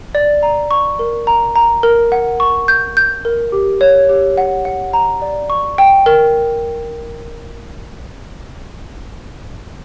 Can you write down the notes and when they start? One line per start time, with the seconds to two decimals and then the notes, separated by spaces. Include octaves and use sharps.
0.15 D5
0.43 A#5
0.71 C#6
0.99 A#4
1.27 A#5
1.56 A#5
1.83 A#4
2.12 F#5
2.40 C#6
2.68 G6
2.97 G6
3.25 A#4
3.52 G4
3.81 C#5
4.09 G4
4.38 F#5
4.65 F#5
4.93 A#5
5.22 D5
5.50 C#6
5.78 G5
6.06 A#4